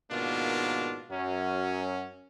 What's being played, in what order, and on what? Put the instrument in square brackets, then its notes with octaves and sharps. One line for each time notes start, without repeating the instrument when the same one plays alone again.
[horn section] G#2 B2 D#3 A#3 D4 F4
F#2 F#3 C#4